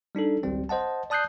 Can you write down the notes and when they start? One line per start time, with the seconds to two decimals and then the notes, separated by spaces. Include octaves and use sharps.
0.15 G3 D4 D#4 A4
0.43 G#1 C#2 G3 C4
0.69 C5 D#5 F#5 A5
1.10 D5 A5 D#6 F#6 G6 C7